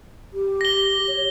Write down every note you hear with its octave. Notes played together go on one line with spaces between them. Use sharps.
G4
A#6 G7
C#5